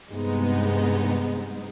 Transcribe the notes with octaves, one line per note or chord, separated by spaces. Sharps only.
G2 C3 G#3 B3 D#4